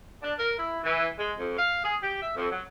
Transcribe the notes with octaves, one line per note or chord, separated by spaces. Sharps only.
D4
A#4
E4
E3
G#3
F2
F5
G#4
G4
E5
F2
F#3